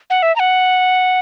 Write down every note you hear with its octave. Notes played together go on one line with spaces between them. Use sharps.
F#5
E5
A#5
F#5